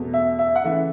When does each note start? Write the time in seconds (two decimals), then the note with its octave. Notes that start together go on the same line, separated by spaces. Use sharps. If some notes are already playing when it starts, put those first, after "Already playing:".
Already playing: E2 B2 A3
0.14 E5
0.39 E5
0.55 F#5
0.64 C#3 E3 A3 E5